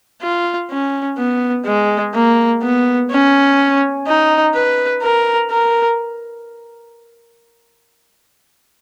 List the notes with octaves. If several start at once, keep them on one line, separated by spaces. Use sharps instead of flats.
F4
C#4
B3
G#3
A#3
B3
C#4
D#4
B4
A#4
A#4